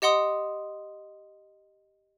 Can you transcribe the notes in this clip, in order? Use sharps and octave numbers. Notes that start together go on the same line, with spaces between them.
G4 D#5 F#5 C6 D#6